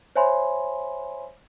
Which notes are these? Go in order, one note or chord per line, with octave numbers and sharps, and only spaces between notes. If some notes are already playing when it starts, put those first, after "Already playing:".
C5 C#5 E5 G#5 B5 C6